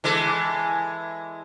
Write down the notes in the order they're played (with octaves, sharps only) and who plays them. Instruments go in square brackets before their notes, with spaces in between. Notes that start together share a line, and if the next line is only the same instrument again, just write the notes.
[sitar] E3 G#3 A4